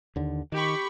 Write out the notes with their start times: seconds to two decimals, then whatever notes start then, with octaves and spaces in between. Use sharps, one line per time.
0.16 D#2 D3
0.52 D#3 G4 B5 C#6